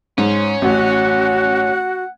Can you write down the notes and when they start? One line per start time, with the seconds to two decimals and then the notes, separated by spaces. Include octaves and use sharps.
0.18 G#2 C#4 C5
0.62 A1 F#4 F#5